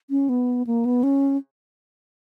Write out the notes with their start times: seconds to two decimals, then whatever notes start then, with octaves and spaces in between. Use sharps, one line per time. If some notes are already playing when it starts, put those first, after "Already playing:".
0.10 C#4
0.29 B3
0.67 A#3
0.85 B3
1.03 C#4